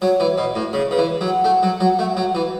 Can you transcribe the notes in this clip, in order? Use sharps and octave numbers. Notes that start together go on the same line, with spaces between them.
F#3 C#5
E3
B2
A2
C#3 C#5
C#3 B4
E3
F#3
F#5
A3
F#3
F#3
A3
F#3
E3